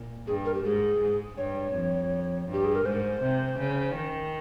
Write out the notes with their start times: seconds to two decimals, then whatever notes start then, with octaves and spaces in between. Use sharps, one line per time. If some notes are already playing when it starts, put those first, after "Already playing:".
Already playing: A#2
0.27 G2 G#4
0.45 A#4
0.54 G4
0.64 G#2 G#4
1.01 G#2
1.37 G2 C#5
1.74 F2
2.49 G2 G4
2.64 G#4
2.75 A#4
2.85 G#2 C5
3.22 C3
3.59 C#3
3.96 D#3